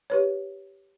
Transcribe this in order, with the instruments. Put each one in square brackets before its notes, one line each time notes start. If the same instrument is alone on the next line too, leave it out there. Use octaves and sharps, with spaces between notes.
[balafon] G4 B4 C#5